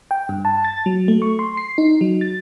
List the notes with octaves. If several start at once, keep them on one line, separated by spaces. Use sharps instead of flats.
G5
G2
A5
A6
F#3
A3
C#6
C6
C7
D#4
F#3
A6